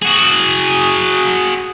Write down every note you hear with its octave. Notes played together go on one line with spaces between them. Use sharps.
F#4 G#4